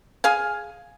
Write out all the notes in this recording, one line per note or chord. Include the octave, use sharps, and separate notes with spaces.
G#4 F5 G#5